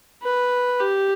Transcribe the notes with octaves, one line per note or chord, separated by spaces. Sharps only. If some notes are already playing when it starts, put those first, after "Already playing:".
B4
G4